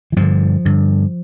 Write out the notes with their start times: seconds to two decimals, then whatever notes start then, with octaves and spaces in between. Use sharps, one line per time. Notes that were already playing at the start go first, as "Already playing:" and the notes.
0.12 E3
0.16 G2 D3 F3
0.65 G2 D3